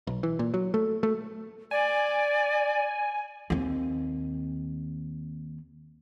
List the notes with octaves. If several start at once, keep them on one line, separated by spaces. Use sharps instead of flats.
B1
E3
A#2
F#3
A3
A3
D5 G#5
D#2 C4